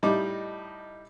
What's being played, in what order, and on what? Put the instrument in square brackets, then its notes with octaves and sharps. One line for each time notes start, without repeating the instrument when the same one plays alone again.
[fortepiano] A2 G3 D#4 G4 D#5 D6